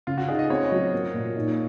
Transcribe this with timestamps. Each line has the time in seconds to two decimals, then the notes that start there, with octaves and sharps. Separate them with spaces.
0.07 C#3 F4
0.18 F#4
0.28 D#4 G#4
0.39 D#5
0.50 C4 C#5
0.72 F#3
0.93 A#3
1.14 A#2
1.36 D#4